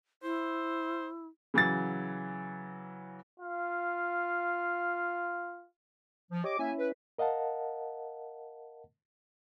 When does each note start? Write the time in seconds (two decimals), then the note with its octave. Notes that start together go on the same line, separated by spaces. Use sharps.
0.23 E4 C5
1.54 C#3 E3 F#3 A6
3.40 F4 F5
6.32 F3
6.44 G4 C#5 D#5 D6
6.59 A#3 C#4 E4 E5 G#5
6.79 B4
7.18 A#4 D#5 F5 F#5 A5